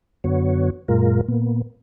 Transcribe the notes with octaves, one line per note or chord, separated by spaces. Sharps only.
F#2 D3 B3 F#4 C#5
F#2 A#2 G#3 F4 A#4
A#2 A#3 B3